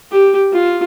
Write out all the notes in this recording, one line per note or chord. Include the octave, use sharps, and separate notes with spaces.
G4
F4